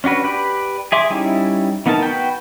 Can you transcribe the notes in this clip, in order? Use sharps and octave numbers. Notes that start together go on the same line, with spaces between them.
C#4 D4 F#4 B4
G4 B4 D5
G#4 E5 C6 D6
G3 C#4 D#4 E4
E3 B3 D#4 A#4 A5
F#4 B4 G5